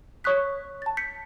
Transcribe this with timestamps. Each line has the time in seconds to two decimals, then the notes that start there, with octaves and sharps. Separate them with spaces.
0.24 C#5 C#6 D#6 F#6 B6
0.82 A5 A6
0.97 G6 B6 C#7